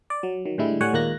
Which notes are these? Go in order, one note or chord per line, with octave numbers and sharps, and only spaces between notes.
D5
F#3
D#3 F#3
A2 D3 G3 G#3 E4
A2 G3 C#5 F#5 G#5
D#2 A#2 G#3 A#3 F#6 A#6